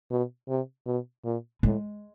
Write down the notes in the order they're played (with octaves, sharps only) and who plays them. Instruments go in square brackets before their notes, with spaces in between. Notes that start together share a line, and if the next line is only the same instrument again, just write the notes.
[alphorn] B2
C3
B2
A#2
[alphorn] A2 [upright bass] G#3